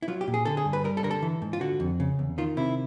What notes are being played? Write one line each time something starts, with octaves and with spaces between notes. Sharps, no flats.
E4
F#3 F4
G4
A#2
G#4
D3 A4
G#4
G2
B4
G3 A#4
A4
D3 A#4
A4
E3
G#2
F4
D3 F#4
F2
C#3
E2
D#3 F4
C3 E4